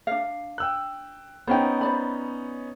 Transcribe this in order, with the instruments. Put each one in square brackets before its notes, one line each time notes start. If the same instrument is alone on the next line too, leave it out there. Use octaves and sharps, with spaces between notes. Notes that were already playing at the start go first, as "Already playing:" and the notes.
[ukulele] D4 F5
[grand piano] G5 E6 F#6
[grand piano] B3 C#4 D#4 [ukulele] C5 G5
[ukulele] C5 D5 B5